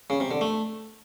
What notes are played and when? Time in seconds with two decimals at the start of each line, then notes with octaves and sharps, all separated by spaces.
0.10 C#3
0.20 C3
0.31 D3
0.41 A3